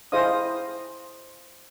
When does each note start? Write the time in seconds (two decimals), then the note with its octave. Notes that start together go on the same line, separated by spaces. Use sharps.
0.12 E4 G#4 C5 D#5 F5 D#6